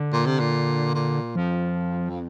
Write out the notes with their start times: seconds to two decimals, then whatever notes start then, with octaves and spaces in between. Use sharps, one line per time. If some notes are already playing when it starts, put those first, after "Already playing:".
Already playing: D3
0.13 A#2
0.26 C3
0.39 A#2
0.94 A#2
1.35 F2 F3